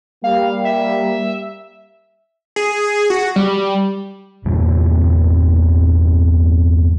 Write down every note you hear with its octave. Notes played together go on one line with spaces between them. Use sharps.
G3 A#3 F5
E5
G#4
F#4
G3
G1 E2 A#2 G3